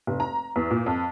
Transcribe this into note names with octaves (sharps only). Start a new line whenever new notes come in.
F1
A#5
E2
A#2
F2